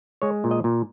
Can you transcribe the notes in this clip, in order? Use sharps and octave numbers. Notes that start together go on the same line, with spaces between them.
G#3 C#5
A#2
D#5
A#2